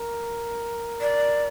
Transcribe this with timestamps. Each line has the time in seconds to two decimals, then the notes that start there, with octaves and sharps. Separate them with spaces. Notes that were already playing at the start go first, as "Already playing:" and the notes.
Already playing: A#4
1.01 D5